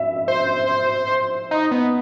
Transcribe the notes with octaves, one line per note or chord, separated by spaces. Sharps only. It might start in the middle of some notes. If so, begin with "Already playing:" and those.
Already playing: E5
C5
D#4
B3